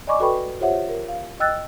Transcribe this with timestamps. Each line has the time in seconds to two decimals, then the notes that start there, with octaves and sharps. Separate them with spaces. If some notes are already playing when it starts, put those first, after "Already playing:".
0.07 D5 D#5 G#5 B5 C#6 D6
0.20 F#4 A4 B4 G5 B5 C#6
0.61 F4 G4 C5 C#5 E5 F#5
0.89 A#4
1.08 F5
1.40 D#5 G5 E6 F#6 A6